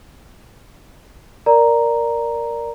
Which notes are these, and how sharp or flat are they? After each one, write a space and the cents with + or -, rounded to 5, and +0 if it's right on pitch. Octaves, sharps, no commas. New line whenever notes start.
A#4 +0 D5 +0 A#5 +0